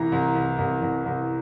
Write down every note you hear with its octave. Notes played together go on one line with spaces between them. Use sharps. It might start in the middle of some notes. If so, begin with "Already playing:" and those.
Already playing: C2 E3 A#5
C2
C2
C2
C2
C2